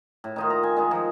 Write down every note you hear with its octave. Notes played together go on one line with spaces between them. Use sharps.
A2
D#3 D#4 F4
A#5
G#5
D#3 G#3 D#4
F3